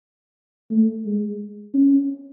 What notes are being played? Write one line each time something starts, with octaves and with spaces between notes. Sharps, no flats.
A3
G#3
C#4